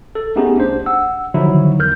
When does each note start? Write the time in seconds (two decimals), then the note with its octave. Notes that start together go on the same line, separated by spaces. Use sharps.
0.15 A4
0.36 A3 B3 C#4 D#4 G4 G#4
0.55 C2 D4 C5
0.86 F#5 E6
1.34 D3 D#3 F3 F#3 D#4 E4
1.79 E2 A#4 F6 G6